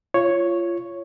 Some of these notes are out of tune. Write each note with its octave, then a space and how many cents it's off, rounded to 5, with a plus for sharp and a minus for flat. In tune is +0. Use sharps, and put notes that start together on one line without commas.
F4 -20 C#5 +0